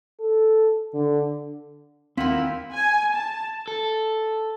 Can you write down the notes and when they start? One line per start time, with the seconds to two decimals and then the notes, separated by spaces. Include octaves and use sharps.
0.20 A4
0.94 D3
2.17 D#2 A#3 C4 E4 F4 F#5 G5 B5
2.73 G#5
3.14 A5
3.68 A4